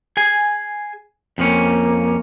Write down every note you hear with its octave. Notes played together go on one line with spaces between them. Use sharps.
G#4 G#5
F2 F3 A#3 C#4